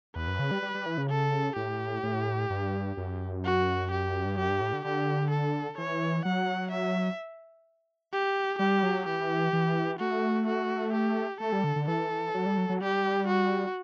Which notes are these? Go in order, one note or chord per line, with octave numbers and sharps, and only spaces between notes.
E2 B4
F#2
C#3
G3
G3
G3
E3
C#3
A4
A2 G4
A2
G2
F#2
F#4
G4
G2
F#2 G4
G2
A2
D3
D3 G4
A4
E3 C#5
F#3 F#5
E5
G4
G3 G4
F#3
E3 G4
E3
A3 F#4
F#4
G4
A3 A4
G3
D3
D3
E3 A4
F#3
G3
F#3
F#3
G3 G4
F#4